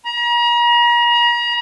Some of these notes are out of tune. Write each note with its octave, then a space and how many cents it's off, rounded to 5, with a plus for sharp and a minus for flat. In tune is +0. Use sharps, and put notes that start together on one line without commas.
A#5 +40